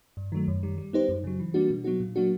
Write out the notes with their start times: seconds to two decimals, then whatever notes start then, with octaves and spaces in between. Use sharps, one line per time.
0.17 G2
0.32 D#3 F#3 A3
0.48 F#2
0.63 D#3 G3
0.78 G3
0.93 B3 D#4 G4 C5
1.09 F#2
1.24 C#3 F#3
1.39 E3
1.54 G3 A#3 D4 F#4
1.70 B2
1.84 F#3 B3 D#4 F#4
2.00 A#2
2.16 F#3 A#3 D4 F#4